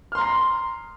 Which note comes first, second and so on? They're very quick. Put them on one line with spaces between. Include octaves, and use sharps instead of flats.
F6 C6 A#5 C7